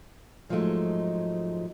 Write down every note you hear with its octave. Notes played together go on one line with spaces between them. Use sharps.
G#2 F3 F#3 G#3 A3 D#4